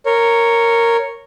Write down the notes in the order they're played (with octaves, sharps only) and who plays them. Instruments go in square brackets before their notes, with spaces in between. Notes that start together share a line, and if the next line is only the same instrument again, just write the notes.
[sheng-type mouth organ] A#4 C#5